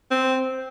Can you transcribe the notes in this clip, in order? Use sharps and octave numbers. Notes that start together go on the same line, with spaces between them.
C4